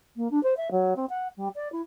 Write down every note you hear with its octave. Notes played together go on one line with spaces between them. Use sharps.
A#3
D4
C5
E5
F#3
C4
F#5
G3
D5
E4